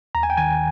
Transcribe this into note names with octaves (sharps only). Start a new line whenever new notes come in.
D#2 A#5
G#5
G5
D#3 G#5